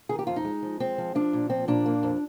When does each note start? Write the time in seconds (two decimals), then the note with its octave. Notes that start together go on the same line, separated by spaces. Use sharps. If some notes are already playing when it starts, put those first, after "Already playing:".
0.09 D#3 G#4
0.19 G4
0.27 F2 F4
0.36 D#4
0.45 G#3
0.63 F3
0.80 G#3 C4
0.98 F3
1.15 F3 D4
1.33 A#2
1.50 F3 C4
1.68 A#2 D4
1.86 A#3
2.03 F2